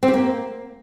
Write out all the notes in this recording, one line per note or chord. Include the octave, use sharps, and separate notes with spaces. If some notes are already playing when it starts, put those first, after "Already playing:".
C4
G4
A#3